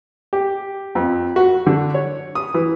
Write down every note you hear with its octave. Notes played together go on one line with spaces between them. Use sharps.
G4
F2
F#4
D3
C#5
D#6
E3